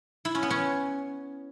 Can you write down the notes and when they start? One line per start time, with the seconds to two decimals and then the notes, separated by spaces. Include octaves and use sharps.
0.25 E4
0.35 C#4
0.43 B3
0.50 C#4